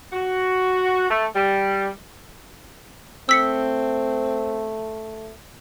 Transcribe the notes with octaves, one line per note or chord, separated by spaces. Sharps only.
F#4
A3
G3
A3 C4 E6 B6 C#7